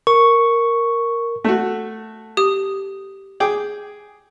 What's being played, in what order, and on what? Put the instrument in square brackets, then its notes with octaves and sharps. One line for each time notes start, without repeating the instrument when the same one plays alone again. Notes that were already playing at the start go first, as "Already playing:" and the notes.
[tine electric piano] A#4 [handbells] C#6
[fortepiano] A3 F#4
[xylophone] G4 D#6
[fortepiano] G#4 G5 D6